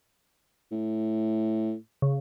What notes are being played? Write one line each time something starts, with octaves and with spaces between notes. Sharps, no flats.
A2
C#3